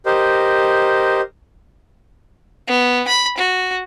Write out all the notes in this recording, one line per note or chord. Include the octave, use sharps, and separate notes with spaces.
G4 A#4 C5 D#5
B3
B5
F#4